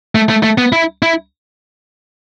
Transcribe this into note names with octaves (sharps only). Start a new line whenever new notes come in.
A3
A3
A3
B3
E4
E4